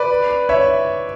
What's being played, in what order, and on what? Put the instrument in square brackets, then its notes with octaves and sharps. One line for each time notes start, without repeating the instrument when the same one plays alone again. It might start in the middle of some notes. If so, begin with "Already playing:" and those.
Already playing: [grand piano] B4 D5
C#5 E5